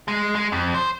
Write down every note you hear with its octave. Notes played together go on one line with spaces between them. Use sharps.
G#3
G#3
F2
C5